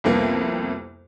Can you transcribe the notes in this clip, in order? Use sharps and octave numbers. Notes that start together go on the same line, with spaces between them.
C2 F2 A#3 B3